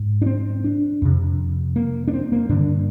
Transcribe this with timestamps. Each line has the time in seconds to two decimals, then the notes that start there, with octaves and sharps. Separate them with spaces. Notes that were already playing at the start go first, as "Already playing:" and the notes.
Already playing: G#2
0.22 D4
0.26 C4
0.64 D4
1.02 F2 C3
1.76 A#3
2.08 D4
2.13 C4
2.32 A#3
2.49 G2 D3 D4